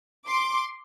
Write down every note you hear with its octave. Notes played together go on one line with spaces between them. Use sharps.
C6 D6